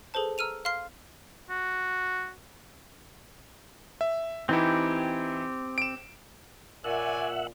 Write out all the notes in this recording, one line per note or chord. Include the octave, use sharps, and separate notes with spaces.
G#4 A4 B4 C5 A5
A#5 E6 F6 D#7 F7
F5 C6 F6 C7
F#4
E5
E3 C4 D#4 E4 G4
D7 E7
A#2 C#5 D5 E5 F#5 G#5